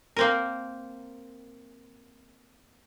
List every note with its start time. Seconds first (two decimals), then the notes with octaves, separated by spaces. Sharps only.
0.16 A#3 C4 A#4